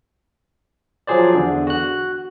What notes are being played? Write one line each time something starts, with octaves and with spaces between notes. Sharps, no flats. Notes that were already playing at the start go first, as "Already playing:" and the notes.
F3 F#3 G#4 C5 D5
E2 D3
F#4 F#6